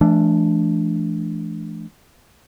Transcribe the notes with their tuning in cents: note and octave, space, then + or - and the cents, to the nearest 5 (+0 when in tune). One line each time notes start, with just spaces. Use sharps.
E3 +30 A3 -30 D4 +0